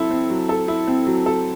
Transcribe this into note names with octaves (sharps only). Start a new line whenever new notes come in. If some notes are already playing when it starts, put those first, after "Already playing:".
Already playing: F#3 C4 E4 A4
C4
F#3
A4
E4
C4
F#3
A4